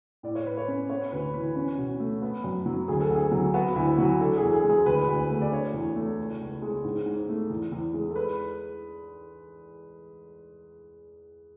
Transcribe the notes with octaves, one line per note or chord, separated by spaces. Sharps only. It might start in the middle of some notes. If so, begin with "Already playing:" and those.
A2 D5
C#5
A2 B4
C#5
C#4
B3 C#5
D2 B4
E3 B4
C#4
B2
A3
B3
F#2
F#3
D2 G#4
A4
D2 G#4
F#3
B3 F#4
D2 E4
F#3 F#4
D4 A4
G#4
E2
G#4
G#3
G#4
D2 B4
D2
A3
D5
D4 C#5
E2
A3
C#2
C#2
G#3
G#2
G#2
A3
E2
E2
G#3
A4
B4